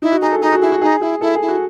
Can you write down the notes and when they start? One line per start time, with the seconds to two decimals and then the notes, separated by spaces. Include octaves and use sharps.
0.02 D#4 E4
0.12 F#4
0.21 D#4 G#4
0.32 A4
0.41 D#4 G#4
0.52 F#4
0.62 E4 G#4
0.72 F#4
0.81 D#4 G#4
1.01 E4 G#4
1.21 E4 A4
1.35 G#4
1.42 E4
1.48 F#4